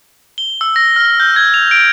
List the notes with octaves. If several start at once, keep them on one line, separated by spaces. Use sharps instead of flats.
G7
E6
A#6
F6
G6
G#6
F7
D7